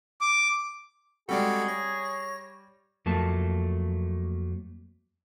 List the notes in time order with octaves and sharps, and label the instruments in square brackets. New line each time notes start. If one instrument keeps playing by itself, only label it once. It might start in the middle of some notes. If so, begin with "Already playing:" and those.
[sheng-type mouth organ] D6
[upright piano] G3 D5 [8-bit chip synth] G#3 C4 A4 [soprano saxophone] F#4 [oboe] G#4
[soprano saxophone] C#5 [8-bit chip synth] A#6
[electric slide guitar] F2 F#3 A3 A#3 A5